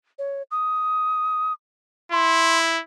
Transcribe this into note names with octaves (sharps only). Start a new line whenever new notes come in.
C#5
D#6
E4 C6